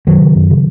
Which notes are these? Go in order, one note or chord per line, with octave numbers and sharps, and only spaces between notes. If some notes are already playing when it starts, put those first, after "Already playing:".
F#2 D#3 F#3
C#3
F#2
C#3